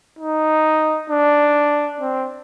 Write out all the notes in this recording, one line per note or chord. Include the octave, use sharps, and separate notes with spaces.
D#4
D4
C4